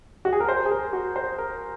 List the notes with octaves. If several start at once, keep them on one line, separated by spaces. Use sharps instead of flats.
F#4
G#4
A#4
C5
G#4
A#4
F#4
C5
A#4